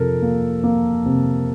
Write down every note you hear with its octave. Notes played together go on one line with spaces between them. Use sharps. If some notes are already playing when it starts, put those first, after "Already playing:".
Already playing: F2 C3 F3 A4 A#4
A#3
A#3
C3